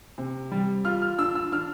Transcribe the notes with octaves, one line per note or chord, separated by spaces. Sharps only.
C3
G3
F4 F6
F6
D4 E6
E6
D4 F6